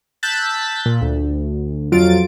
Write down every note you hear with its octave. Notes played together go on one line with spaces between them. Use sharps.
A5 E6 F#6 G6 A6 B6
A#2
D2
F2 F#3 F4 A6 D7